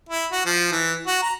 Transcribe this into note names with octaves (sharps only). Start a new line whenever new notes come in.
E4
F#4
F3
E3
F#4
A#5